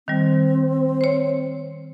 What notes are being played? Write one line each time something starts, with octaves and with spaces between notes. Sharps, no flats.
D#3 G3 C4
C5 C#5